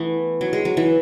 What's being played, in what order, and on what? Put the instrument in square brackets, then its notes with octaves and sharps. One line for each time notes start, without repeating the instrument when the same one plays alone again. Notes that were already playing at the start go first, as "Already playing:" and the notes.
Already playing: [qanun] E3 A3 B3
F#3
G#3
F#3
E3